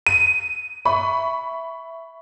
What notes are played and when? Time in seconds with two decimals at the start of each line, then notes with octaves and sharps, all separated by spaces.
0.07 D#7
0.85 E5 B5 C#6